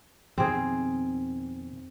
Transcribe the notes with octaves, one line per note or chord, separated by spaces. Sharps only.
F2 B2 D#3 C4 G#4